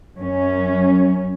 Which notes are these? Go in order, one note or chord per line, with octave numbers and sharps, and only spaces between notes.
F#2 F#3 C#4